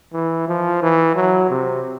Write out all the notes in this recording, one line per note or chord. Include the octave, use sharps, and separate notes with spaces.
E3
F3
E3
F#3
C3